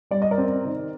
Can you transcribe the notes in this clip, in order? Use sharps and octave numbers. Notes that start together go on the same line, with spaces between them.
G3 D5
D#5
A#4 D5
C4
D#3